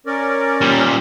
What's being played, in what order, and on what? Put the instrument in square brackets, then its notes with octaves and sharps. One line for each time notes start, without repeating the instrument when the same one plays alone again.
[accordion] C#4 A#4 D5
[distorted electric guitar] A#2 G3